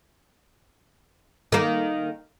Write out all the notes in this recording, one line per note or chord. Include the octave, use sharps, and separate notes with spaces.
D#3 A#3